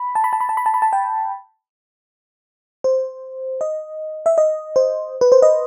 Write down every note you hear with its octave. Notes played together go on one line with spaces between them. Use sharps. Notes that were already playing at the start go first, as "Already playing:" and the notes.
Already playing: B5
A5
B5
A5
B5
A5
B5
A5
B5
A5
G5
C5
D#5
E5
D#5
C5
B4
C5
D#5